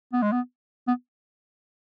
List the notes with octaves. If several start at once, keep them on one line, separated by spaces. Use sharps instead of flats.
B3
G#3
B3
B3